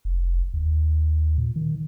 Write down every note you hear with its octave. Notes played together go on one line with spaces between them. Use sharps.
F1
D#2
A#2
D#3